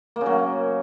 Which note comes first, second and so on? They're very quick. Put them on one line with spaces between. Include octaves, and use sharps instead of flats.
A#3 C#3 F#3